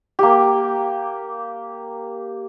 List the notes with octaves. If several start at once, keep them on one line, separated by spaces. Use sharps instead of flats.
A#3 G4